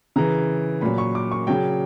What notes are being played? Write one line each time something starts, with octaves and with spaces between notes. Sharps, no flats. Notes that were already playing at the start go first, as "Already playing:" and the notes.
C#3 E3 A#5
A#2 F#3 B5
C#6
D6
C#6
C#3 F#3 G5